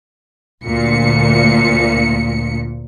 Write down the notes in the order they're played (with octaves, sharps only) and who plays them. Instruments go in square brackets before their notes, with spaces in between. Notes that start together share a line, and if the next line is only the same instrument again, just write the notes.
[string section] D2 A#2 C#7